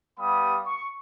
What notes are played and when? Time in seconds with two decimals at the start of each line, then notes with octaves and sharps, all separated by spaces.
0.19 G3 B3 G4 F5 B5 D#6
0.65 C#6